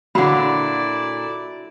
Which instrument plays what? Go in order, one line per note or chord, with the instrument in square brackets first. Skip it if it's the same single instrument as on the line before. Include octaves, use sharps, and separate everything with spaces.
[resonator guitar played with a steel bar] A#2 D3 [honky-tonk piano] F#3 [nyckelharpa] E4 D5 [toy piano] F#5 B5